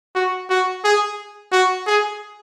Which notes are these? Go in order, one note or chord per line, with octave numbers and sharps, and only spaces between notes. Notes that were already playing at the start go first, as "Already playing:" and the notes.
F#4
F#4
G#4
F#4
G#4